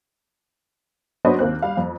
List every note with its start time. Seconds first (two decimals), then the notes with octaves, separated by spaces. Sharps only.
1.25 F#3 B3 D4 F#4 C5 D#5
1.39 D#2 A#3 C4 F#6
1.62 G3 F5
1.77 F2